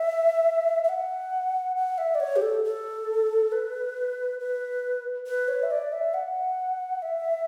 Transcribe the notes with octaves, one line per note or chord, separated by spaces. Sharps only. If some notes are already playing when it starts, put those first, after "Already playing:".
Already playing: E5
E5
F#5
F#5
E5
D5
C#5
G4
A4
A4
B4
B4
B4
C#5
E5
D5
E5
F#5
E5